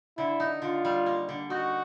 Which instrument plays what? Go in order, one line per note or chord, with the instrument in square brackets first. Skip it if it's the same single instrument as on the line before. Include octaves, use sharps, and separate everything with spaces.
[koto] D3 [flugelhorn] E4
[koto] D#4
[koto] D3 [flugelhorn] F4
[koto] G3
A#3
D3
[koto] D#4 [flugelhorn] F#4